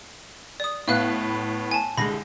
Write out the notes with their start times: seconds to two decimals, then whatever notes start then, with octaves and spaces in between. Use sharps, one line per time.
0.60 D5 D#6
0.88 A2 B3 E5 F5 F#6
1.71 G#5 A5
1.98 C2 D3 G#3 B5 A#6